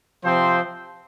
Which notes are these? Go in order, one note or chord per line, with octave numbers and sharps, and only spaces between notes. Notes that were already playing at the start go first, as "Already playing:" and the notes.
C3 F3 C4 C5